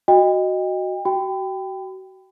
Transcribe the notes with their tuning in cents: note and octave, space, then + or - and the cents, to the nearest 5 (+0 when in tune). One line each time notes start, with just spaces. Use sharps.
F#4 +0 D#5 +0 G5 +30
F#4 +35 G5 +0 B5 +35